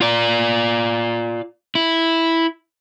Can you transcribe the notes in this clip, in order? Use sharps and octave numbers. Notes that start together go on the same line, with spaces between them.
F4 D5
E4